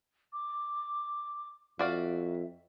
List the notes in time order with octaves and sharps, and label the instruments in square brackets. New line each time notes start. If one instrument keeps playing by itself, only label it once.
[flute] D6
[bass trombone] F2 [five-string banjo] F#4 D5 F5 [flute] E5